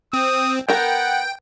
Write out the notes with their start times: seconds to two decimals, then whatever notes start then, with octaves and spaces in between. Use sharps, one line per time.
0.13 C4 D#6
0.69 B3 A#4 F#5 G5